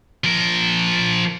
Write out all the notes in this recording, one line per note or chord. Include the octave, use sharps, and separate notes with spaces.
F3 A#4